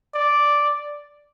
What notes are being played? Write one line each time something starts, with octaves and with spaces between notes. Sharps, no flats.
D5